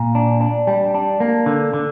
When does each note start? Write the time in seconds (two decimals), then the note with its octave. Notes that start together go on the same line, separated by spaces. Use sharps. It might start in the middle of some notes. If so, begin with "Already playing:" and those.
Already playing: A#2
0.15 D4
0.41 D4
0.67 G3
0.95 D4
1.20 A#3
1.46 D3
1.73 D3